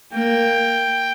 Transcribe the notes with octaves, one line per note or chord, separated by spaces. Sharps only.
A#3 G5